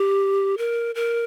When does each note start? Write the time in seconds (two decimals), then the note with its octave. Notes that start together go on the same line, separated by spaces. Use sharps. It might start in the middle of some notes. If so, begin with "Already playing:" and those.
Already playing: G4
0.58 A#4
0.95 A#4